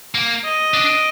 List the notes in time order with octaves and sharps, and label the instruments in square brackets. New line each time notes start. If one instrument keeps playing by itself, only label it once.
[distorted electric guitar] A#3
[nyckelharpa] D#5
[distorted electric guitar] D4